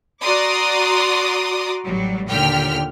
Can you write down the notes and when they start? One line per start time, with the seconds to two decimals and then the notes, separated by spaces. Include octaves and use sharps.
0.22 F#4 D5 A#5 C6 D6 D#6
1.85 A1 F#3 G3
2.28 D#2 A#2 D3 G5 F6 B6